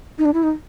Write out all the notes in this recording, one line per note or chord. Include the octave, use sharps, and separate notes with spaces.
D#4
D4
E4
D#4